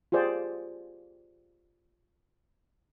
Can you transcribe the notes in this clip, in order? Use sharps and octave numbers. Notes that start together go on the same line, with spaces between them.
F4 G4 G#4 C5 D5